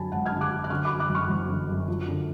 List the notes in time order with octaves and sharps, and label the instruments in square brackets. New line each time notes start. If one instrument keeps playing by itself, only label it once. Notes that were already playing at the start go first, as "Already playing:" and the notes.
Already playing: [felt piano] F#2 D3 F#3 G#5 A5 B5
G#1 F#5 A5
F6 G#6
D3
D6 F#6
F#2
F#6
D3 C#6 F6
F#2 B5 D6
D6 F#6
F#1
C#6 F6
F#1
D3
F#2
F3
D3